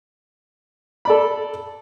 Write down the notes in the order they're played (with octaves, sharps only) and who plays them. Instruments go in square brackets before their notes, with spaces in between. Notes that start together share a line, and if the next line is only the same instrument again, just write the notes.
[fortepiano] A4 D5 B5